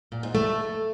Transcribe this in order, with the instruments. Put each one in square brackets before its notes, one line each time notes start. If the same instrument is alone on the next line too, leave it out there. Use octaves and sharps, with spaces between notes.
[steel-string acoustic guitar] A#2
G#2
A3